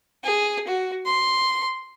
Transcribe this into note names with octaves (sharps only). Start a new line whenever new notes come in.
G#4
F#4
C6